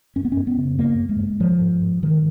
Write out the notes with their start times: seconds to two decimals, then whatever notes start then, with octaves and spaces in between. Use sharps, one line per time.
0.16 F#2 C#4
0.25 B3
0.32 F#2 C#4
0.47 B3
0.58 C#3
0.78 F#2 A#3
0.99 F#2
1.09 G#3
1.20 F#2
1.40 G#2 F3
1.61 G#2
1.82 G#2
2.02 G#2 D#3